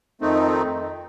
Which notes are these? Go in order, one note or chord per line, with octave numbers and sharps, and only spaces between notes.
F2 D#3 A3 C4 D#4